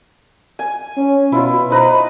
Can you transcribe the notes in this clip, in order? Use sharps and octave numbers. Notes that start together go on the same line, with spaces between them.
G#5
C#4
B2 E4 F4
D#4 B4 C5 A#5